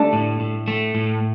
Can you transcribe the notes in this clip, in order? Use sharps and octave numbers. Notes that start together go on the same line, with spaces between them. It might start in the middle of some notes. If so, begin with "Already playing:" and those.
Already playing: A3 D4
A2
A2
A3
A2